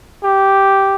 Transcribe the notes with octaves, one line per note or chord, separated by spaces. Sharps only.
G4